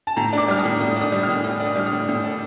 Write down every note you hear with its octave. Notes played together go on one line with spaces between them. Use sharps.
A5
A2 A#5
D4 D6
G3 F6
D#6
A2
A2 D#6
D4
D#6
G3
F6
A2
A2 D#6
D4 D#6
G3 F6
D#6
A2
A2
D4